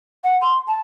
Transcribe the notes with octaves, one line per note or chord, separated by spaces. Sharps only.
F#5
C6
A5